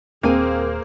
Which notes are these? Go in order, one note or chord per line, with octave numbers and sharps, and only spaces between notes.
D#1 A#3 C4 G#4 C5 F5 G#5